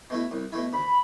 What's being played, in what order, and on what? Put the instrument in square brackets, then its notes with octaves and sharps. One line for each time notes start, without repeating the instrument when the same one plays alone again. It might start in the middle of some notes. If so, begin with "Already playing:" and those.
[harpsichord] B2 A3 E4
C2
B2 A3 E4
[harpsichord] D2 [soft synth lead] B5